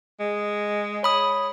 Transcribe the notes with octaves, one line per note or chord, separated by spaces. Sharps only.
G#3
C#5 B5 D#6